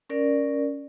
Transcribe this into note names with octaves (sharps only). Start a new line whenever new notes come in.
C#4 A#4 D5